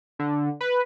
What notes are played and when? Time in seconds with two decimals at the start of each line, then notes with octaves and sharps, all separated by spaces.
0.19 D3
0.61 B4